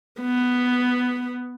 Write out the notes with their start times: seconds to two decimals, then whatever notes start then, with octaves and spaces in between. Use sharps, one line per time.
0.21 B3